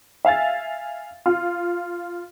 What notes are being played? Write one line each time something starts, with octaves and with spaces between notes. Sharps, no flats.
E5 F5 G#5 A6
F4